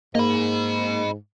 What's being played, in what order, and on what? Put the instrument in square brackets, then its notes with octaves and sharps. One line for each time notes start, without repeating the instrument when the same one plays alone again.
[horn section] G#2 [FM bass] A#3 [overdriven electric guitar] D#5 B5